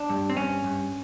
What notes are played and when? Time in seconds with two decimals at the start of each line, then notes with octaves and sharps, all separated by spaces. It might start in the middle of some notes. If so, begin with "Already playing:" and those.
Already playing: D4
0.10 G2
0.30 C4
0.36 G2 C#4
0.64 G2